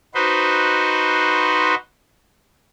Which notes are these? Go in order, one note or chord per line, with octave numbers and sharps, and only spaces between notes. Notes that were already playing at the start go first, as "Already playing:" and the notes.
D#4 F#4 B4 C5